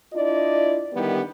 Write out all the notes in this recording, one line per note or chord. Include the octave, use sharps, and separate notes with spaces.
D4 E4 F4 D5 D#5
D3 D#3 G3 B3 E4 G4